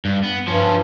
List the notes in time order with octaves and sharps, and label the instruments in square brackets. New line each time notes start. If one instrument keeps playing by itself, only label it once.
[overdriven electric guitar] G2
B3
[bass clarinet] G2 [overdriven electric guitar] F3 C#4